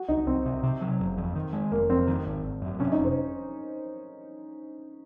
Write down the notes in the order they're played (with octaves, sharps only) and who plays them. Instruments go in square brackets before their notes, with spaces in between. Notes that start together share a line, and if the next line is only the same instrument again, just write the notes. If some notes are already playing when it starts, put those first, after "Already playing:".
Already playing: [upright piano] F#4
[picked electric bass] C2 [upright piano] D#4
[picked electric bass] C2 [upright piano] C4
[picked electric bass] C3
C3
F#3
F#1
F2
D#3
G#3
[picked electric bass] F1 [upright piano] A#3
[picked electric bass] F2 [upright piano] C4
[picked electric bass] D#3
G#1
G#1
F#2
[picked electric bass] C3 [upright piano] C#4
[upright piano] D#4
[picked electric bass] F1
[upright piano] C5